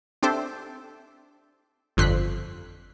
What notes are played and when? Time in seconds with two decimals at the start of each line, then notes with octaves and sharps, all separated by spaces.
0.23 C4 D4 G4 A4 C5 E5
1.97 G1 F2 D3 C6 F#6 B6